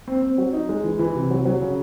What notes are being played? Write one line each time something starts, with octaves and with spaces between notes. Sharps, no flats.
C4
C4
F#3
D#4
G#3
E3
E3
C3
F#3
F#3
C#3